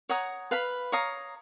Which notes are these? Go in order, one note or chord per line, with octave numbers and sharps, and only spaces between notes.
C#5 F#5 A#5 D#6
B4 F5 B5
C#5 F5 A#5 D#6